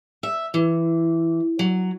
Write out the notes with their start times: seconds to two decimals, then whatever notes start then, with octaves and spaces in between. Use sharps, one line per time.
0.23 E5
0.54 E3
1.59 F#3